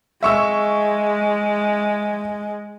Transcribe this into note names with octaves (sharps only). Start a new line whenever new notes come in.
G#3 E5 C#6 E6